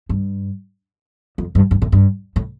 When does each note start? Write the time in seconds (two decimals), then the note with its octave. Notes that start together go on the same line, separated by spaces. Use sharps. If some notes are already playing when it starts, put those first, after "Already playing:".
0.09 G2
1.38 F2
1.55 G2
1.71 G2
1.82 A2
1.92 G2
2.36 A2